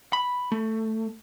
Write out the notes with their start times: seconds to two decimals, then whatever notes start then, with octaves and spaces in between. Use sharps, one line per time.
0.13 B5
0.52 A3